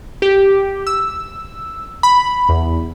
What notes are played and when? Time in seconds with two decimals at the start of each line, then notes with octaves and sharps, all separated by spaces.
0.22 G4
0.87 E6
2.03 B5
2.49 E2